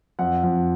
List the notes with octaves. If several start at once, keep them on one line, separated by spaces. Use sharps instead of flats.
F2 F#5
F2